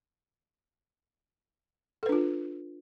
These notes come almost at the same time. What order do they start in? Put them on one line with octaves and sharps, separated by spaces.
A4 B4 D4 F4